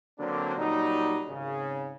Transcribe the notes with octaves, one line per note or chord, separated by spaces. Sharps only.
D3 F#3 A#3 C4 D4
A#2 F#3 G3 D#4
G#1 C#3